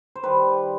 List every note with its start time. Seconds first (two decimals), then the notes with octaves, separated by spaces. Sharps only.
0.16 C5
0.23 D#3 G3 B4